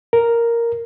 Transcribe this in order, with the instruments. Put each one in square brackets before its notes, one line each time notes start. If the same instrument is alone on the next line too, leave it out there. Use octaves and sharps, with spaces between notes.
[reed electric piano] A#4